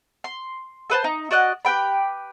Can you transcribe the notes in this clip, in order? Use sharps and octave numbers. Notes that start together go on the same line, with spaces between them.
C6
A4 B4 C5 A5
D#4
F#4 D5 D#5 F#6
G4 B4 G5 B5